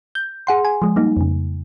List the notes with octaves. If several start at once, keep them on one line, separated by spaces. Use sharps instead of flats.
G6
G#4 F#5 C6
G#5
F3 G#3
G3 A#3 D#4
F2 C#3